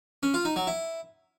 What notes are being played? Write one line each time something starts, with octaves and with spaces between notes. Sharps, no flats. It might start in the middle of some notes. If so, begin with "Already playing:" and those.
C#4
F4
D#4
F#3
E4